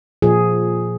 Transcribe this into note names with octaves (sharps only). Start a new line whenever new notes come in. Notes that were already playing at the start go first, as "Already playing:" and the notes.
A#2 F3 G#4